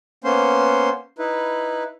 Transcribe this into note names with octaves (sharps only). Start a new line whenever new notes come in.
A#3 B3 C#4 C5 C6
D#4 E4 B4